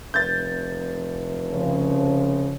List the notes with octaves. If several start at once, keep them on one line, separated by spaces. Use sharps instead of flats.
F1 G6 A6
C#3 F3